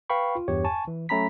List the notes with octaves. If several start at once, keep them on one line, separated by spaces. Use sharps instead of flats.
B4 F5 G5 B5 C#6
F4
E2 G2 G4 C#5
G#5 A5 C#6
E3
F#3 A3 C#4 A#5 B5 B6